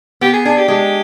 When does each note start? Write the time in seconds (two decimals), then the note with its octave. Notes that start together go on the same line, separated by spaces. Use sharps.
0.21 B3 G4
0.33 G#4
0.45 D4 G#4
0.57 G4
0.68 G#3 G4